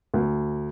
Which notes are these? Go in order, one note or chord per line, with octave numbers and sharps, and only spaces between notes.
D2